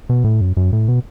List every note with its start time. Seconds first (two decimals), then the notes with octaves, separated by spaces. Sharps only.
0.09 B2
0.24 A2
0.41 F#2
0.57 F#2
0.73 A2
0.89 B2